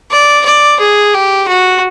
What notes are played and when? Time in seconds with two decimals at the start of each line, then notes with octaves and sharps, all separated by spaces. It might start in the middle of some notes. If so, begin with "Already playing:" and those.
0.11 D5
0.45 D5
0.79 G#4
1.14 G4
1.48 F#4